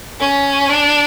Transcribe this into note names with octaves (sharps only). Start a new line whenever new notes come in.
C#4
D4